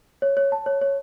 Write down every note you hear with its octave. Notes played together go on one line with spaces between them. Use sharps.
C#5
C#5
A5
C#5
C#5